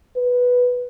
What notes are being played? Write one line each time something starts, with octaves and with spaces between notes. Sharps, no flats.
B4